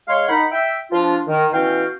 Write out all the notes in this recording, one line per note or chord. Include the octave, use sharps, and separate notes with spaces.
G#3 C#5 F5 C6
D#3 D#4 F#5 B5
E5 G5
F3 D4 F4
D#3
B2 E3 C#4 F#4 F5 G5